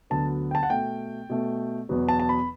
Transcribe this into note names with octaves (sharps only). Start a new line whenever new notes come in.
D2 D3 F#3 B3 A5
G5
A5
F#5
B2 A3 G5
B2 A3
E2 B2 F#3 B3
A5
A5
B5